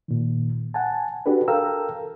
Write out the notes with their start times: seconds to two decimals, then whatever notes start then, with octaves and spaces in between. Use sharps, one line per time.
0.08 A#2 D#3
0.74 F#5 G#5 A5
1.26 D4 F#4 G4 A4 B4
1.48 A4 A#4 F5 G5 A#5 E6